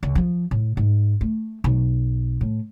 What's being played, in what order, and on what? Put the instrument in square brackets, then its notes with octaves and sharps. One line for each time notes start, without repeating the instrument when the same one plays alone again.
[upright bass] C#2
F3
A2
G#2
A3
B1
A2